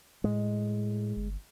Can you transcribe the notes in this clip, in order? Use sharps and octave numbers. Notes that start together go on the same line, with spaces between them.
A2 G#3
G1